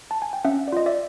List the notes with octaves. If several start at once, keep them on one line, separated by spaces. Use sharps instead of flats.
A5
G#5
G5
C#4 E5 F#5
D5
F4 D#5
D5 E5